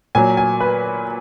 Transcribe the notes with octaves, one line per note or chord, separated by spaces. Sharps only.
A#2 F#3 G#5
G#5
B4